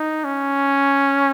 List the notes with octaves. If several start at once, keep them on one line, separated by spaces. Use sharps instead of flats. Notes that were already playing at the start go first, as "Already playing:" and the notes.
Already playing: D#4
C#4